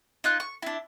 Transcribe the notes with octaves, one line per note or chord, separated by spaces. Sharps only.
D#4 F4 F#6
C#6
D4 E4